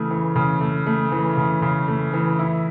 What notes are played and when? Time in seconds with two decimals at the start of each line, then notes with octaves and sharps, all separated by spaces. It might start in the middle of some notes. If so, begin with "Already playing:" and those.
Already playing: C#3 E3 A3
0.10 E3
0.36 C#3
0.61 A3
0.86 A3
1.12 E3
1.37 C#3
1.62 C#3
1.88 A3
2.14 E3
2.39 E4